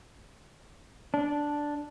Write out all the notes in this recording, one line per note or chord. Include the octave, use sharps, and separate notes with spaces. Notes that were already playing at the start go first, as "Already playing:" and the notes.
D4